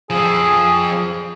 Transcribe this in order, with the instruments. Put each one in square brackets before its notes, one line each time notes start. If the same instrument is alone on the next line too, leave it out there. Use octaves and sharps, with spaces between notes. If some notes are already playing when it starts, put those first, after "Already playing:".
[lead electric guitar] F3 C4 [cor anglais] G#4